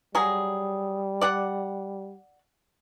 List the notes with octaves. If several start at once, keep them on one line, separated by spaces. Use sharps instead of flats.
F#3 G3 G#4
D5 F#5